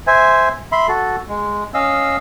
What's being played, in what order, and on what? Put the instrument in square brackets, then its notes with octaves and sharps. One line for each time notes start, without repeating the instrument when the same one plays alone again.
[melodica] C5 E5 G#5
E5 B5 C6
F#4 A4
G#3
C#4 D#5 F5 E6